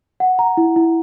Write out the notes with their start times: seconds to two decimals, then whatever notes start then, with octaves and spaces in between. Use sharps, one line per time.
0.20 F#5
0.39 A#5
0.57 E4
0.76 E4